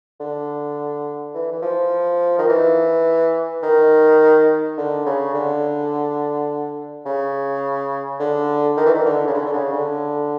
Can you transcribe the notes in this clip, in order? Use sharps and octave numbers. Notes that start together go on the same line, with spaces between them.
D3
E3
E3
F3
D#3
E3
D#3
D3
C#3
D3
C#3
D3
D#3
E3
D#3
D3
C#3
D3
D3
C#3
D3